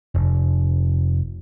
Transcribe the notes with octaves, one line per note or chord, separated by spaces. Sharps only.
F1